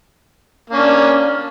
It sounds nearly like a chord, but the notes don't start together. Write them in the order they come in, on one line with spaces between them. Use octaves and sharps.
A#3 C#4 D4